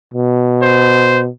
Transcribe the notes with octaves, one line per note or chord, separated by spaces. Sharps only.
B2
C5